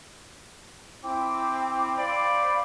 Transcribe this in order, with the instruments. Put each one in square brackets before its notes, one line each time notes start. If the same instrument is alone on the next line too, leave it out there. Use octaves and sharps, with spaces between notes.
[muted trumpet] C4 [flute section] E4 G5 D6
[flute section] C5 F5 B5 [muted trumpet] D5